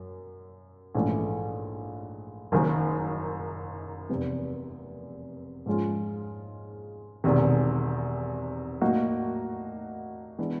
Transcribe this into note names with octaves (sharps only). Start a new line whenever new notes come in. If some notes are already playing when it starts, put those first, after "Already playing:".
Already playing: F#2
A#1 G#2 E3 A3 C#4
F#1 F#2 D#3
F1 E2 C3
G#2 F3 G#3 C#4 F4
E1 E2 C3 D#3
A2 F#3 A#3 D#4 F#4
E3 G#3 B3 D4